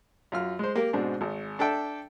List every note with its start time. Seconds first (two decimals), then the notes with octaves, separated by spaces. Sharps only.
0.32 F#2 F4 F6
0.59 G#3 C5
0.75 A#3 G4 A#4
0.93 G#2 B2 C4 D4
1.21 G#1
1.59 D4 A4 E5 G5